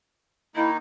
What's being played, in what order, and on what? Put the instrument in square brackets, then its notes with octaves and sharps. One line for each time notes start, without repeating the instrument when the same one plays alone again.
[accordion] D#3 A#3 D#4 [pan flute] E4